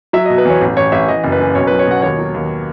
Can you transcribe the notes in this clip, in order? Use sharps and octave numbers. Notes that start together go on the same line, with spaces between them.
F#3 E5
D#5
B2
B4
E2 C#5
A1
A1 C#5
A1 E5
E3 D#5
F#1
B4
F#2
B1 C#5
B4
F#3
C#5
B2 F#5
D#2 C#5
F#3
D#2